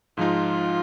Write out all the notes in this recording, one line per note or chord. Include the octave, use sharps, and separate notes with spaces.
G#2 F3 G#3 D#4 F4